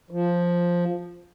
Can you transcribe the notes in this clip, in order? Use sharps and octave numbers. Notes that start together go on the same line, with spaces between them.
F3